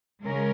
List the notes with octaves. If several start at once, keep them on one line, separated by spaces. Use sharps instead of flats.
C#3 G#3 C#4 A#4